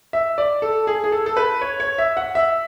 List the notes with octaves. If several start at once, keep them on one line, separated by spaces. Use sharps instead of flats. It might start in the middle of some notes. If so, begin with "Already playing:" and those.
E5
D5
A4
G#4
G#4
A4
A4
B4
C#5
C#5
E5
F#5
E5